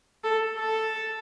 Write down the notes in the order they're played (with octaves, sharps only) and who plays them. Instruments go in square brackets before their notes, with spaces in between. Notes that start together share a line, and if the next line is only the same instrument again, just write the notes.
[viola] A4
A4